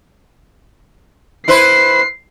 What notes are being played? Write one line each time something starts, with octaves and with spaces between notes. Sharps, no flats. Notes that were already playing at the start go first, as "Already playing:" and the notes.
E4 B4 C5 C7